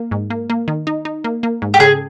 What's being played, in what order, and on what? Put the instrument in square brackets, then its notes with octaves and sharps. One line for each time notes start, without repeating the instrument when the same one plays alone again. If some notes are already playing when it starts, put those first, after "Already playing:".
Already playing: [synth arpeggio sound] A#3
G#2
A#3
A#3
D#3
D#4
D#4
A#3
A#3
G#2
[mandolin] G4
[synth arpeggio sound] C#3 [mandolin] G#4